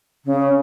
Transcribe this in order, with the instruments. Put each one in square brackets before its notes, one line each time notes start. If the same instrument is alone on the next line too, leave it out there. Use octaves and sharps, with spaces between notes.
[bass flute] C#3